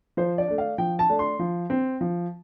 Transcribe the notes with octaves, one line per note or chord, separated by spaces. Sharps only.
F3 C5
D5
A3 D4
F5
F3 G5
A5
A3 D4
C6
F3
C4
F3